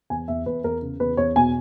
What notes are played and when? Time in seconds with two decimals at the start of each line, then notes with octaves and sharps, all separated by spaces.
0.10 E2 G#5
0.28 E2 E5
0.46 E2 B4
0.64 E2 A#4
0.82 C#3
1.00 E2 B4
1.17 E2 C#5
1.36 B2 G#5